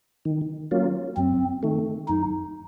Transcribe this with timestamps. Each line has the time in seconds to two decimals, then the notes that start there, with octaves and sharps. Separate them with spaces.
0.25 D#3
0.71 F#3 A#3 C#4 F4
1.17 F#2 C4
1.63 D#3 A3
2.08 F#2 D#4